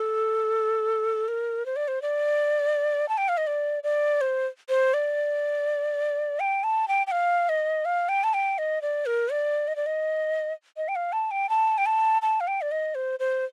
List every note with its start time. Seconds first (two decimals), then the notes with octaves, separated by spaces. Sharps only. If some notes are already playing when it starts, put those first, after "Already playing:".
Already playing: A4
1.28 A#4
1.66 C5
1.76 D5
1.88 C5
2.02 D5
3.09 A5
3.18 G5
3.29 F5
3.37 D#5
3.47 D5
3.84 D5
4.21 C5
4.69 C5
4.94 D5
6.40 G5
6.64 A5
6.88 G5
7.07 G5
7.12 F5
7.49 D#5
7.85 F5
8.09 G5
8.24 A5
8.34 G5
8.58 D#5
8.82 D5
9.06 A#4
9.32 D5
9.68 D#5
9.76 D5
9.86 D#5
10.77 D#5
10.88 G5
10.96 F5
11.13 A5
11.31 G5
11.49 A5
11.78 G5
11.86 A5
12.22 A5
12.40 F5
12.48 G5
12.61 D5
12.71 D#5
12.95 C5
13.20 C5